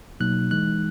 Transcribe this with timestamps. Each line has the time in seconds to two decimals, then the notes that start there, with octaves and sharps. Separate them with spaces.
0.20 B2 F#3 A#3 D#4 F#6
0.51 E3 G#3 D#4 F#6